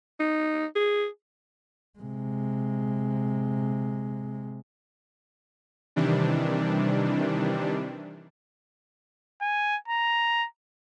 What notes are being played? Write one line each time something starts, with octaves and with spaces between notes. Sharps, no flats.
D#4
G#4
C3 G#3
C3 D#3 E3 G3 D4
G#5
A#5